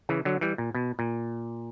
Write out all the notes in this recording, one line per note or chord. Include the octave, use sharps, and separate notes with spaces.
C#3 E3
D3 F#3
E3 G3
A#2
B2
A#2